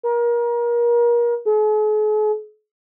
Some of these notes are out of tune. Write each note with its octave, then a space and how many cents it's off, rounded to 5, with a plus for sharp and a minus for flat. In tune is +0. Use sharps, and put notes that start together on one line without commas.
A#4 +30
G#4 +45